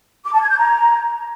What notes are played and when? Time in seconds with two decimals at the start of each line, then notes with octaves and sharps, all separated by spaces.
0.25 D6
0.33 A5
0.42 G#6
0.50 G6
0.58 A#5